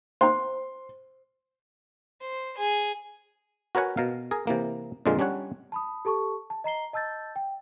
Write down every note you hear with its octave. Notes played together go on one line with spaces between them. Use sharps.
A#3 C4 D#4 C5 C6
C5
G#4
F#4 A#4 B4 C#5 F#5 G#5
B2 A#4 F5
G#4 A#4
C3 E3 A#3
F2 A#2 D3 G#3 A#3 F4
G3 C#4 D4 C#5 F#5
A5 B5 D#6
G4 A4 A5 C#6
A5
D#5 A#5 C7 G7
D#5 A5 E6 G6 A6
G5